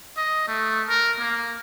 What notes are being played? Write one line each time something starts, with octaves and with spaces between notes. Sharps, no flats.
D#5
A3
A#4
A#3